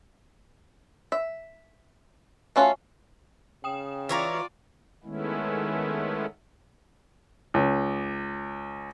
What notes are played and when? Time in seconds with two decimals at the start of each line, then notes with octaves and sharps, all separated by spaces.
1.12 E5
2.56 A3 C#4 F4 F#4
3.64 C#3 G5 D#6 E7
4.09 E3 F4 C#5 D5 A#5
5.04 D#3 G#3 A3 B3 C#4 E4
7.54 C#2